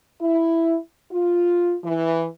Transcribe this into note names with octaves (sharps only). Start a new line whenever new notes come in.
E4
F4
E3